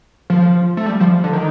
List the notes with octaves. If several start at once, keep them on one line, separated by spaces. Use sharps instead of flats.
F3
A3
G3
F3
D3
D#3